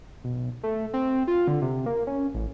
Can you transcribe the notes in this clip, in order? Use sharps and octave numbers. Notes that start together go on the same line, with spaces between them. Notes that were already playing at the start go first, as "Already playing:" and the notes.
B1
A3
C4
F4
D3
C3
A#3
C#4
A1